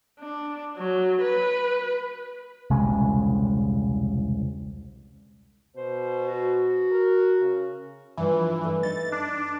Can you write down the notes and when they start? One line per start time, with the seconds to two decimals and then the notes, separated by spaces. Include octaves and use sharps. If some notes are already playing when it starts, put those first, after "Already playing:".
0.19 D4
0.77 F#3
1.21 B4
2.70 E1 C2 C#3 G#3
5.76 B2 C5
6.27 F#4
6.91 A#4
7.40 C#3
8.17 G2 E3 F3
8.64 G2 A3
8.83 D#4 A6
9.12 D4